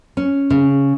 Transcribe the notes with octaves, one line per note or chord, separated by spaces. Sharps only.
C#4
C#3